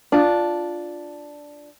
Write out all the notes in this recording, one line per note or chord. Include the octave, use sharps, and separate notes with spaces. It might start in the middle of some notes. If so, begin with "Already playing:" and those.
D4 F4